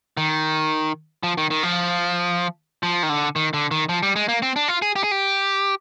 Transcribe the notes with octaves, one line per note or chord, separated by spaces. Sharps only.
D#3
F3
D#3
D#3
F3
F3
D#3
D3
D#3
D3
D#3
F3
G3
G#3
A#3
C4
D4
F4
G#4
G4
G#4
G4